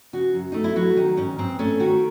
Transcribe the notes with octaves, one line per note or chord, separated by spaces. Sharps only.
C#3 F#4
F#2
A3 D#4
E4
F#3 F#4
D#3 D#4
G#2 C#4
G#2 C4
A3 C#4
D#3 F#4